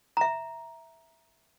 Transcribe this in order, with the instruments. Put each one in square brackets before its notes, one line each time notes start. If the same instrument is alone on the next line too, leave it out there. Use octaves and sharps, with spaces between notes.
[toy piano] E5 A#5